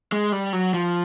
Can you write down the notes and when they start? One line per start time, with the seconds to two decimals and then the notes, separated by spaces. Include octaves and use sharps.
0.12 G#3
0.32 G3
0.53 F#3
0.74 F3